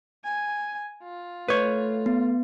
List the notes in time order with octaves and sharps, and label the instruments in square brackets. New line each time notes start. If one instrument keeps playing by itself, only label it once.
[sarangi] G#5
F4
[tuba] A3 [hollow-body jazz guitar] B4 C#5
[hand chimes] B3